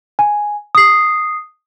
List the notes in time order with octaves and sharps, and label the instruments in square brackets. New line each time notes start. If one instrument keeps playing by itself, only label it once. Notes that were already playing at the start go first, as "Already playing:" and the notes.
[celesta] G#5
D#6 C7